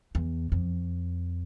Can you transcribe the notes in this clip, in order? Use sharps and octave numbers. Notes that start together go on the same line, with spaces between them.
E2
F2